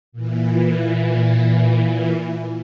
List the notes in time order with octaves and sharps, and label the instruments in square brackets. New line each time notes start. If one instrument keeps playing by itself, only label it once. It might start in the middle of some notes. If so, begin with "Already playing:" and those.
[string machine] A#2 E3